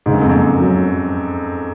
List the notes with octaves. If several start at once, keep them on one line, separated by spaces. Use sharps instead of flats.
G#2 C#3
F#2
F2
F#2 A#3
F#3